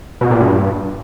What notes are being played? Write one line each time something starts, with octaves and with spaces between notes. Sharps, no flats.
B2
A#2
G2